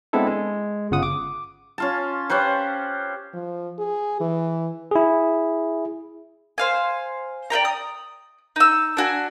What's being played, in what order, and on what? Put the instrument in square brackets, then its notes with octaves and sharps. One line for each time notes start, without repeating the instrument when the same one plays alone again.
[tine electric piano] G#3 B3 C4 D4 E4 A4
G#3
G1 C#3 F4 F#5 D#6
D6
[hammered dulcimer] C#4 F4 A5
C#4 G4 B4 C5
[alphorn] F3
G#4
E3
[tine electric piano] E4 G#4
[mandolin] C5 F5 G#5
D5 D#5 G5 A#5
D#6
D#4 E6
D4 F#4 G#5